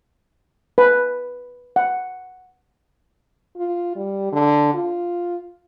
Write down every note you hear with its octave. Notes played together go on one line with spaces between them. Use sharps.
B4
F#5
F4
G3
D3
F4